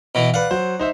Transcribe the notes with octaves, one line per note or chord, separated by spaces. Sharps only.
B2 E3
B4 D5 F5 F#5
F#3 C5
D#4 C5 E5